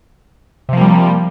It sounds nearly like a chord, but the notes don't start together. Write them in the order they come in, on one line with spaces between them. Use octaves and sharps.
C3 F3 A#3 G3